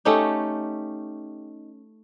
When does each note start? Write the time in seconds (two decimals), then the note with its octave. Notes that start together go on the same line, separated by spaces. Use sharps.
0.05 A3 C#4 D#4 G4